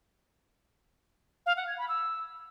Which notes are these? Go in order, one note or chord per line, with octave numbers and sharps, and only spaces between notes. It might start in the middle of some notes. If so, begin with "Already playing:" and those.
F5
F#5
G#6
B5
E6